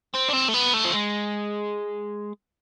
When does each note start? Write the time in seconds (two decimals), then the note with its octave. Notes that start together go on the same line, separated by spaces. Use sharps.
0.14 C4
0.28 D4
0.33 C4
0.48 A3
0.54 B3
0.74 A3
0.85 F3
0.93 G#3